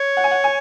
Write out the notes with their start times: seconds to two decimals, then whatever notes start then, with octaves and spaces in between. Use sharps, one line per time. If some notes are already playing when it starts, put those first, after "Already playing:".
Already playing: C#5
0.17 F#5
0.24 G#5
0.31 F#5
0.44 G#5